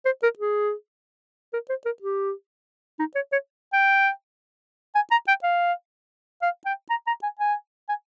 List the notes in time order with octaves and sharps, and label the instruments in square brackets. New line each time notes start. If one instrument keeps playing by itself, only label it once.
[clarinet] C5
A#4
G#4
A#4
C5
A#4
G4
D#4
C#5
C#5
G5
G#5
A#5
G5
F5
F5
G5
A#5
A#5
G#5
G#5
G#5